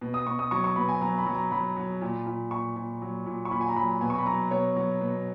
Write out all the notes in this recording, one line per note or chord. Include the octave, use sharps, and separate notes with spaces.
B2
D#6
B2 C#6
D#6
F#3 C#6
C#6
B2 B5
G#5
F#3 A#5
B5
F#3
A#5
F#3 B5
F#3
A#2
A#2
A#2 C#6
A#2
F#3
A#2
C#6
A#2 B5
G#5
A#5
F#3 B5
B2 G#5
C#6
B5
F#3 A#5
B2 C#5
F#3
B2